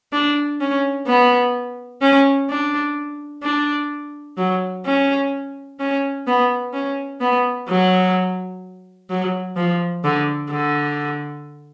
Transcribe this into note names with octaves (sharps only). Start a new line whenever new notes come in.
D4
C#4
B3
C#4
D4
D4
F#3
C#4
C#4
B3
C#4
B3
F#3
F#3
F3
D3
D3